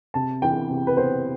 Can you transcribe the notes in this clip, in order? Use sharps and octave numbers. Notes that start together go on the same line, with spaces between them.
C3 A5
E3 G5
C3
B4
B3 C5